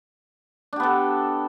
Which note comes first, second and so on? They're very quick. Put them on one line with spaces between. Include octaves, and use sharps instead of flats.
D4 G4 B3 A4